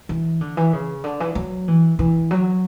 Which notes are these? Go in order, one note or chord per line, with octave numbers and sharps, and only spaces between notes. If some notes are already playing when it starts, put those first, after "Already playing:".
E3
D3
E3
C#3
D3
E3
F#3
E3
E3
F#3